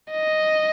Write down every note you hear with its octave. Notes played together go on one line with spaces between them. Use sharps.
D#5